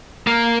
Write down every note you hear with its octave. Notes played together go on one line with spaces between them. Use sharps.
A#3